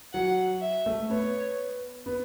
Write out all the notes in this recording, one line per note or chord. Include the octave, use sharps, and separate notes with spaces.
F#3 F#5
E5
A3
B3 C#5
B3